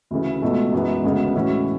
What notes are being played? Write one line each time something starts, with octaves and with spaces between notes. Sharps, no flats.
D2 C#3 E3
C#2 B2 A3
F#2 E3 G#3 B3
D2 C#3 G#3 B3
A2 E3 G#3 C#4 F#4